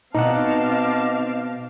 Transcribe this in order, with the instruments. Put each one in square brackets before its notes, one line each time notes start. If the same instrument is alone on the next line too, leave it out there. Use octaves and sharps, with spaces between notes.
[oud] B2 [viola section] C4 F5 [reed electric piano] D#4 F#5 [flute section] D#5 A5 D6